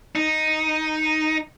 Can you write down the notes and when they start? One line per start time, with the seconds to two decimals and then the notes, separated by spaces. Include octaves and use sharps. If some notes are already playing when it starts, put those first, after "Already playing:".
0.16 D#4